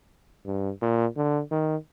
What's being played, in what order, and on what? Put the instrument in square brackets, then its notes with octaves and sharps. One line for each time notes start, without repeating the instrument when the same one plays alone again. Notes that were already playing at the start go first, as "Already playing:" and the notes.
[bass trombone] G2
A#2
D3
D#3